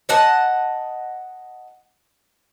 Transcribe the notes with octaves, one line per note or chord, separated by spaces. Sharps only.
D#5 F#5 A5